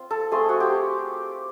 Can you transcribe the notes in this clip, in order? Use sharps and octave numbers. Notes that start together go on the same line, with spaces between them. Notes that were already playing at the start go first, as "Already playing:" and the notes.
Already playing: C4 F4
A4
A3 C4 F4 G#4
F#4
G4